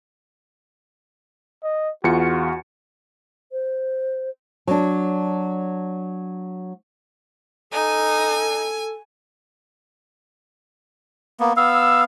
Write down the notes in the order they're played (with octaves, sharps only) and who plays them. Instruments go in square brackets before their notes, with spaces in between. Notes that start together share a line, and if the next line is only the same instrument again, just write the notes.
[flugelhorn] D#5
[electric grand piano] E2 F4 C#7 [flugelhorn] F#4
[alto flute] C5
[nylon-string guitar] F#3 D4
[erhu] D#4 [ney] A4 [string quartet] G#5
[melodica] A#3 B3
[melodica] B3 F5 [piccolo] E6